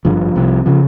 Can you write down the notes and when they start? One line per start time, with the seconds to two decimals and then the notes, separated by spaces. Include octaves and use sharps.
0.05 G#1 G2 D3 F3
0.36 C2 C3
0.66 C#3 F3